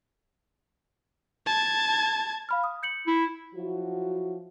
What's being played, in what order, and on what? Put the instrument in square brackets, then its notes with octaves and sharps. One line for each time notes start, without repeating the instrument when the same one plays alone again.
[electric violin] A5 G#6
[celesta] F5 B5 F6
D#6
G6 C#7 F#7
[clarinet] E4
[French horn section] F3 F#3 E4 F#4